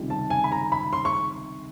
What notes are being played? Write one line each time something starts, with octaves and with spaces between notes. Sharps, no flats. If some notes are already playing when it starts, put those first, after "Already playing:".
Already playing: C#2 C3 D#3 G3
A5
G#5
B5
A#5
B5
C6
C#6